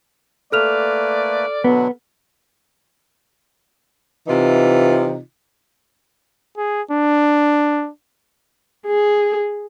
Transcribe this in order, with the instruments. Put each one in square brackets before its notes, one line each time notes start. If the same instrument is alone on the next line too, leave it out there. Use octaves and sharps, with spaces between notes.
[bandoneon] A3 A#3 B4 [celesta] A4 F6 F7 [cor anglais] D5
[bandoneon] B2 D3 F#3 [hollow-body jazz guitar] B3
[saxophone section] C3 E3 D#4 F4
[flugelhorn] G#4
D4
[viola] G#4